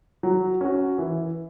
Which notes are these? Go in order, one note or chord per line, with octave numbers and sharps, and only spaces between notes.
F#3
C#4 F#4
E3